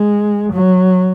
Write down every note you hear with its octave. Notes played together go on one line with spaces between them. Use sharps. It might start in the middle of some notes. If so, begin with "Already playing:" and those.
Already playing: G#3
F#3